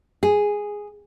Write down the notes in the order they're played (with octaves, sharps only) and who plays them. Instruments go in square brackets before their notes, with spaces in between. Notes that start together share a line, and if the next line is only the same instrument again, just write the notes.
[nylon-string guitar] G#4